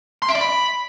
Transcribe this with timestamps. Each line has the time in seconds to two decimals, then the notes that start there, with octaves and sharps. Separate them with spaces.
0.22 C6
0.29 E5
0.35 D5
0.41 B5